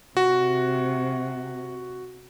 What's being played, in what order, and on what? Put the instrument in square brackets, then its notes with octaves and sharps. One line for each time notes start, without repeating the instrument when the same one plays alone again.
[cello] C3 [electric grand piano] F#4